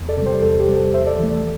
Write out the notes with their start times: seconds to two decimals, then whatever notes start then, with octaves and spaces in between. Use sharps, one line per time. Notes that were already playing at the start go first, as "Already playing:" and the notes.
Already playing: E2
0.08 A4 D5
0.17 C3
0.22 G3 G4 C5
0.42 E2 A4
0.60 G4
0.69 C3 G3
0.76 A4
0.93 E2 C5 E5
1.07 A4 D5
1.19 E3 A4
1.23 A3
1.32 A4